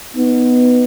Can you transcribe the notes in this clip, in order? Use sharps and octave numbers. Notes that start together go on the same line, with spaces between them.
B3 D#4